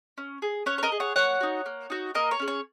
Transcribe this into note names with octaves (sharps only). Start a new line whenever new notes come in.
C#4
G#4
C#4 C#5 F#5
C#5
A#4 D#5
G#4
C#5 F#5
A#3 C#5 F#5
D#4 F#4
A#3
D#4 F#4
A#3 A#4 D#5
C#5
C#4 G#4
C#5